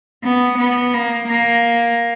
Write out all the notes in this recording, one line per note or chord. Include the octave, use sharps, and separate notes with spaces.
B3
B3
A#3
A#3